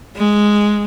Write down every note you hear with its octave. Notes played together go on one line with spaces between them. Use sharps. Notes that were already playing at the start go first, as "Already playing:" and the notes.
G#3